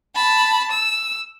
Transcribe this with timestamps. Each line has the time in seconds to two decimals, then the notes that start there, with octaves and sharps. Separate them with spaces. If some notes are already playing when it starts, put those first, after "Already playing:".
0.15 A5 B5
0.71 E6